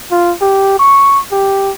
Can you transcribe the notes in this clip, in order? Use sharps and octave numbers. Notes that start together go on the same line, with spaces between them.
F4
G4
C#6
G4